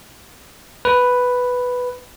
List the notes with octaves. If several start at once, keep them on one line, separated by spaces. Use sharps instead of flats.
B4